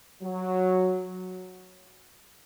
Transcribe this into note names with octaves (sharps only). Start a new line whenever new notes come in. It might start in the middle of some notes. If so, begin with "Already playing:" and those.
F#3